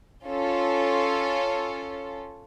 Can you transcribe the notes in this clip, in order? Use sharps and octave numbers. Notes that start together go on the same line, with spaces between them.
C#4 F4 A4